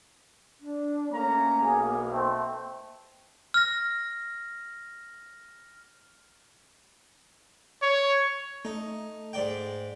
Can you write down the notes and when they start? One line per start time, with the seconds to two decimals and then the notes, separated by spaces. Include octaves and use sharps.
0.61 D4
1.13 A3 A#3 C#4 A#5
1.61 B1 B2 G#4
2.12 A3 C4
3.54 F6 A#6
7.82 C#5
8.65 A3 D#4
9.33 G#2 D5 G5